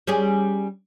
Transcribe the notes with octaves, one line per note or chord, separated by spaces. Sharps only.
G3 C#4 G#4